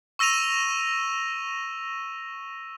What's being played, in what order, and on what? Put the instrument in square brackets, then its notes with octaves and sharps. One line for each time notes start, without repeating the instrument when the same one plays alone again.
[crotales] C#6 E6 A#6 D#7 F7